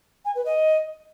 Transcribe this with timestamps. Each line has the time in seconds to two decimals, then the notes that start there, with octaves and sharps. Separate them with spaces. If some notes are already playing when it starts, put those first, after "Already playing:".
0.25 G#5
0.35 B4
0.45 D#5